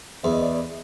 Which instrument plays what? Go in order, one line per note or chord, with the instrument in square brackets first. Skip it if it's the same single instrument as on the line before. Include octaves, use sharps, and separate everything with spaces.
[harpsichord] E2 [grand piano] E5
[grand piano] D#5
D5 E5